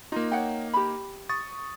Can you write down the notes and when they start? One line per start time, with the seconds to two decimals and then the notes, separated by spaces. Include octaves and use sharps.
0.12 A#3 D#4 F4
0.32 C#5 F#5 G5
0.74 G4 B5
1.29 C#6 D#6 A6